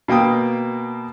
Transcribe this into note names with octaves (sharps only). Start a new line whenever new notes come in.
B2 A#3 G5 D#6